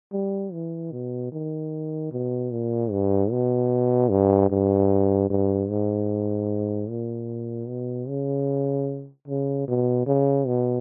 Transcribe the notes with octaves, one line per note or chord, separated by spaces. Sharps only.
G3
E3
B2
D#3
B2
A#2
G2
B2
G2
G2
G2
G#2
A#2
B2
C#3
C#3
B2
C#3
B2